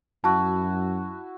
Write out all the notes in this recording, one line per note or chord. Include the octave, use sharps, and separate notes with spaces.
F#2 E4 F#4 A5